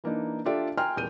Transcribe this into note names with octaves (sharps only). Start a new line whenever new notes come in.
E3 A#3 D4 D#4
D4 F4 G4 A4 D5 E5
G5 G#5 A#5 C6 F6
D#1 E2 G6 D#7